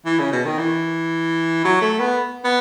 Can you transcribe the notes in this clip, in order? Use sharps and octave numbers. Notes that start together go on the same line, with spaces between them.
E3
C#3
B2
D#3
E3
F#3
A3
B3
B3